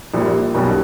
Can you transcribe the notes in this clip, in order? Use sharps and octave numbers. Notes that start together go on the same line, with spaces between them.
A#1 A#2 G3
B1 B2 G3 A#3 C#4